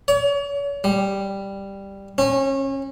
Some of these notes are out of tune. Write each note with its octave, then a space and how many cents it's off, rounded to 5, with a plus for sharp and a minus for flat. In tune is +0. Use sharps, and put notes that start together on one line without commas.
C#5 +40
G3 +5
C#4 -30